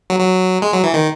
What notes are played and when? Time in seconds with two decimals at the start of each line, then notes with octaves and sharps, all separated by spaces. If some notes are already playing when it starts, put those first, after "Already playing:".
0.10 F#3
0.20 F#3
0.62 G#3
0.73 F#3
0.83 E3
0.94 D#3